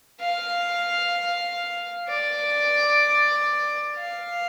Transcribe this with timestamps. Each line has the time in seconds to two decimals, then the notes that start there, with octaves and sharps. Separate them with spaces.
0.21 F5
2.09 D5
3.98 F5